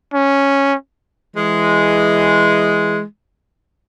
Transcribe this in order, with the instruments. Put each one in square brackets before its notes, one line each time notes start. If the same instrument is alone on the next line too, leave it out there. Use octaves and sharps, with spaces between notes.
[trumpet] C#4
[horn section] E3 G#3